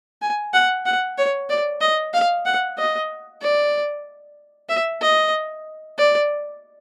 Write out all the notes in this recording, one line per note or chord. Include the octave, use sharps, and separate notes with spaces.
G#5
F#5
F#5
C#5
D5
D#5
F5
F#5
D#5
D5
E5
D#5
D5